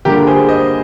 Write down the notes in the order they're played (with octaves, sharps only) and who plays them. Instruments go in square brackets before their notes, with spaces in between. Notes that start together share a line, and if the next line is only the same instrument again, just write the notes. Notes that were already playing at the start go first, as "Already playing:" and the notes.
[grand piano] D3 G3 A#3 D4 F4 [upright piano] G4 A#4
[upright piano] G#4 C5
C5 D#5